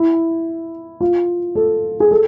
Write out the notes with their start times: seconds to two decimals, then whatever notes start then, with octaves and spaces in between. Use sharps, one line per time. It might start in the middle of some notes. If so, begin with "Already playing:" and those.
Already playing: E4
1.01 F4
1.55 A4
2.00 G#4
2.11 A4